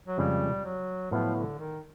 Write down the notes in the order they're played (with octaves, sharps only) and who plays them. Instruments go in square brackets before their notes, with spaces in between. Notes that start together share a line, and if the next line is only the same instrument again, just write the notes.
[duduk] F#3
[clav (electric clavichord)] F2 C#3 F3 G#3 [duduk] G3
[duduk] F#3
[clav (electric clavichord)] A2 F#3 B3 E4 [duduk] F3
[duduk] D3
D#3